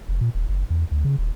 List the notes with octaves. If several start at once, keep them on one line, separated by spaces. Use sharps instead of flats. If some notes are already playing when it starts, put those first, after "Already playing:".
F1
A#2
D#1
F#1
E2
D2
C#3
D#1